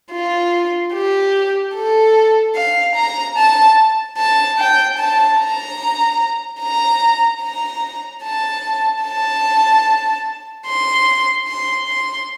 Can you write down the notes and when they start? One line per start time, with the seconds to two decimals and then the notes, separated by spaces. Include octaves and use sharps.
0.12 F4
0.93 G4
1.75 A4
2.56 F5
2.95 A#5
3.37 A5
4.18 A5
4.59 G5
4.98 A5
5.39 A#5
6.60 A#5
7.42 A#5
8.23 A5
9.03 A5
10.67 C6
11.47 C6
11.88 C6